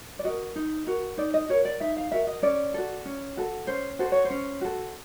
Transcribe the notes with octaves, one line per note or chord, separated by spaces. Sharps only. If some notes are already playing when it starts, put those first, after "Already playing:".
D5
F#4 A#4 D#5
D#4
F#4 A#4
D#4 D5
D#5
F#4 A#4 C#5
D5
D#4 E5
F5
F#4 A#4 E5
D#5
C#4 D5
F#4 A4
C#4
F#4 A4
C#4 C5
F#4 A4 C5
C#5
C5
C#4
F#4 A4